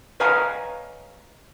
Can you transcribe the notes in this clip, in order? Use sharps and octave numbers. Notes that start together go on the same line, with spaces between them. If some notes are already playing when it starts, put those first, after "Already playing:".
B4 C#5 D#5 F5 G#5 A#5